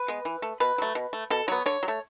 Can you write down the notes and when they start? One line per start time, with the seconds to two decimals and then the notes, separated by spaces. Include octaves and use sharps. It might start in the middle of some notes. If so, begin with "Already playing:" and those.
Already playing: B4
0.08 G#3 B3
0.25 E3
0.42 A3
0.60 B2 B4
0.78 F#3 A3
0.95 B2
1.13 A3
1.30 B2 A4
1.48 F#3 B3 C#5
1.66 D3 C#5
1.83 F#3
1.88 A3